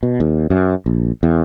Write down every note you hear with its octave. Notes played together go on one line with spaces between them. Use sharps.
B2
D#2
F#2
A#1
E2